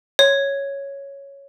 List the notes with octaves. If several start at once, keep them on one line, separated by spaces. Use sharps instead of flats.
C#5